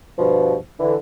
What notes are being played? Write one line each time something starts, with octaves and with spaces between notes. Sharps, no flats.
G2 B2 F3
D3 E3